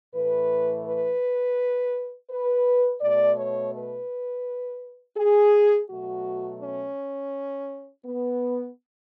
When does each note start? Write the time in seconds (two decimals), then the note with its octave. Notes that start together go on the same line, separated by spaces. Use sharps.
0.14 A2 E3 A3 B4
0.86 B4
2.30 B4
3.01 B2 A3 D5
3.38 C#5
3.75 B4
5.17 G#4
5.90 B2 F#3 A3 F#4
6.61 C#4
8.05 B3